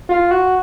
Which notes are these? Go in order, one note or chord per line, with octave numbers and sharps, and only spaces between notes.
F4
F#4